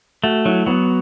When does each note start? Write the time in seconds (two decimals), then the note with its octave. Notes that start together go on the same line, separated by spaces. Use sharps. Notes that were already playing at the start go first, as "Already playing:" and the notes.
0.24 A3 F#4
0.45 F#3 E4
0.66 F#3 B3